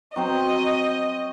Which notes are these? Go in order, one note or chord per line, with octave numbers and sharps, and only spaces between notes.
F#3 C4 C5 D#5